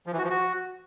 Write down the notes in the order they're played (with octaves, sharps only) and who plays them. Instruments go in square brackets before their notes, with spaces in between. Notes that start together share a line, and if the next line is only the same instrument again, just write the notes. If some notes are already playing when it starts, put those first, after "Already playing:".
[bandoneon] F3
E3
F#4
F3
F#4